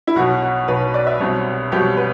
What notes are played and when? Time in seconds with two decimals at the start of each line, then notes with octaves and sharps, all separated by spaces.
0.07 E4
0.16 B1 B2 F#3 F#4
0.43 F#4
0.68 B1 B2 F#3 B4
0.94 D5
1.07 E5
1.20 C2 B2 F#3 C4
1.71 C2 B2 F#3 C4 G4
1.97 B4